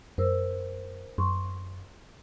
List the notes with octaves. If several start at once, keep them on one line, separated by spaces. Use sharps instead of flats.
F#2 A#4 C5 E6
F#2 C6 C#6